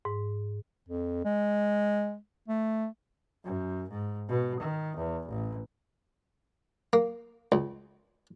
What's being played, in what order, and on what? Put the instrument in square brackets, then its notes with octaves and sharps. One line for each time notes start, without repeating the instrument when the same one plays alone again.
[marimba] G#2
[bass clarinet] F2
G#3
A3
[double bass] F#2
G#2
B2
D#3
E2
A1
[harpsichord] A#3
C#2